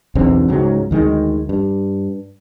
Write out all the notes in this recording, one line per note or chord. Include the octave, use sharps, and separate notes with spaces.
B1 E2 D3 C4
C#2 G#2 F#3
D2 D#3 G#3
G2